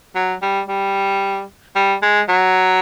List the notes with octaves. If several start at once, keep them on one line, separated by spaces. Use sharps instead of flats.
F#3
G3
G3
G3
G#3
F#3